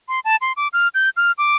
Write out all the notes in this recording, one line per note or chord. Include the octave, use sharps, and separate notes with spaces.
C6
A5
C6
D6
F6
G6
F6
D6